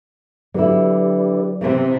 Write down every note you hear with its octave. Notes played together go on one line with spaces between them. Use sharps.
D3 F#3 E4 G4 B4 D5
C3 E3 B3 C4